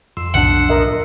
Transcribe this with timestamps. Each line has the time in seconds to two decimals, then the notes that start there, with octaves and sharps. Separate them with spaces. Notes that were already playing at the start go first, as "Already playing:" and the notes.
0.17 F2 C6 E6
0.34 B1 A2 D4 F#5
0.69 A#4 D#5 E5